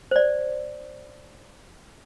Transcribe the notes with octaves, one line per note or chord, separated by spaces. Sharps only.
C5 D5